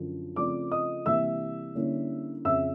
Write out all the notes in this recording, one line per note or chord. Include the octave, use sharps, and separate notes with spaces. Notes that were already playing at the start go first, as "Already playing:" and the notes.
Already playing: F#2 D3 F3
C#3 F3 A3 C4 D5 D6
D#5 D#6
C3 E3 G3 A#3 D4 E5 E6
D3 G3 A#3 C#4 E4
F2 C#3 F3 E5 E6